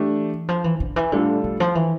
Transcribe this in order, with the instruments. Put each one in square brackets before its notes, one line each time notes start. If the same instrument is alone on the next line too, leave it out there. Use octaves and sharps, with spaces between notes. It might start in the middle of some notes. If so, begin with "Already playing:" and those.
Already playing: [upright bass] E3 [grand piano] A3 D4 G4
[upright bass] F3
E3
D3
E3
[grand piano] A2 G3 D4 F4 A4 [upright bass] D3
[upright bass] D3
F3
E3